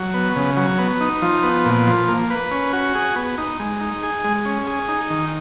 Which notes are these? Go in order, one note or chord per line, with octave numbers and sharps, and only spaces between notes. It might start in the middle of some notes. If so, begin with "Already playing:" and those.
Already playing: F#3
B3
C#3
F#3
B3
D#4
F3
B3
A#2
F3
A#3
B4
C#4
F#4
G#4
B3
D#4
G#3
D#4
G#4
G#3
C#4
G#4
D#4
D#3